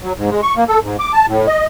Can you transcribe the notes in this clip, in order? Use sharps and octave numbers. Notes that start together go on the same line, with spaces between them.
F#3
G#2
G#3
C#6
A#3
A4
G#2
D6
A5
A2
D#5